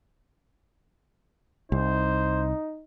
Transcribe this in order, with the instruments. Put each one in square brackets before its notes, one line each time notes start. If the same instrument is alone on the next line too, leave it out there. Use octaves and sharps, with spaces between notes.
[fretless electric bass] C2 [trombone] D#4 [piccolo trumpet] C5